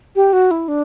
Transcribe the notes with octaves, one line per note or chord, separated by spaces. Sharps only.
G4
F#4
E4
D4